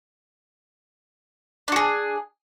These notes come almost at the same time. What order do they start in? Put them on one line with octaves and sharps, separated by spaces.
D4 F#4 G#4